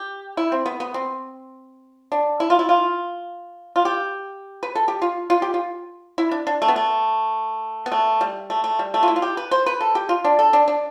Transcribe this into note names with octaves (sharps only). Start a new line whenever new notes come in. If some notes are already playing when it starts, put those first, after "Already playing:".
Already playing: G4
E4
C4
B3
B3
C4
D4
E4
F4
E4
F4
F4
G4
B4
A4
G4
F4
F4
G4
F4
E4
D4
D4
A3
B3
A3
B3
A3
G3
A3
A3
G3
A3
F4
E4
F4
G4
B4
C5
B4
A4
G4
F4
D4
A4
D4
D4